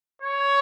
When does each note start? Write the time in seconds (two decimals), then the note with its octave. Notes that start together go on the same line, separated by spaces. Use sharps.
0.22 C#5